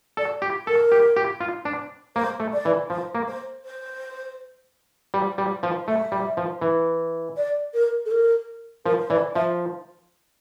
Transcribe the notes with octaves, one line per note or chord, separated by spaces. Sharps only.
A4 D5
G4
A4 A#4
G4
G4
F4
D4
A#3 C5
A3
D5
E3
F3 C5
A#3
C5
C5
G3
G3
F3
A3 E5
G3
F3
E3
D5
A#4
A4
A#4
F3 A#4
C5
E3 D5
F3 E5